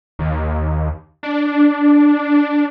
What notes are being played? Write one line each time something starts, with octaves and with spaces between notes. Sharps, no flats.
D#2
D4